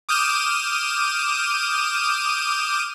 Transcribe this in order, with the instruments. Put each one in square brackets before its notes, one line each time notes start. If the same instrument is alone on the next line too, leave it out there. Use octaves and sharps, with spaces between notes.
[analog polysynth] D6 D#6 F6 G6 D#7 E7